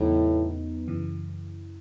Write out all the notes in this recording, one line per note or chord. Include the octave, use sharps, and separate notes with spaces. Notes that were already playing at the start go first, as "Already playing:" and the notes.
Already playing: E2 A2 C#3 F#3 B3 D#4
F#2 C#3 E3